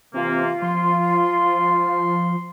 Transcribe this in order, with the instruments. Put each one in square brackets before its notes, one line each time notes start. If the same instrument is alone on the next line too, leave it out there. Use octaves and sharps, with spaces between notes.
[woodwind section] C3 E3 A#3 [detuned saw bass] C4 [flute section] F4
[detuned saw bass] F3 [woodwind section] C6